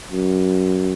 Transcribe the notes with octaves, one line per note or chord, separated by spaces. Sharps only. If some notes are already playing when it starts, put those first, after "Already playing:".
F#2